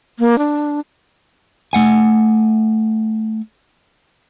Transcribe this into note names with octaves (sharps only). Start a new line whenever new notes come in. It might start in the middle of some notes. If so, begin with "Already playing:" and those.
A#3
D4
A3 F#5 G#5